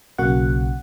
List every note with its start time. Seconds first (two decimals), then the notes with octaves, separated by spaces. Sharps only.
0.18 B1 C#3 A#3 F#4 F#5